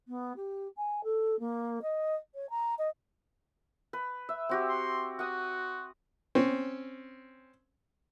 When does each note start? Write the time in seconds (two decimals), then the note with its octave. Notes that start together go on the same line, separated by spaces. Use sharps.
0.08 B3
0.36 G4
0.76 G#5
1.03 A4
1.39 A#3
1.82 D#5
2.34 C#5
2.49 A#5
2.78 D#5
3.93 B4
4.29 E5
4.49 C4 F#4 G4
4.69 C6
5.19 F#4 F#5 D#6
6.35 C4 C#4